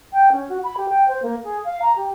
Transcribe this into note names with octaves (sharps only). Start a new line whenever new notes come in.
G5
C#4
F#4
B5
G4
G5
C5
A#3
G#4
F5
A#5
G4